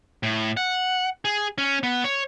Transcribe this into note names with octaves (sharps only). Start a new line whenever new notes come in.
A2
F#5
G#4
C#4
B3
C#5